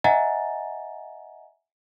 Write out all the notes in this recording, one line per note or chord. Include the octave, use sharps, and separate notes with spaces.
D#5 E5 F#5 G#5 A#5 A6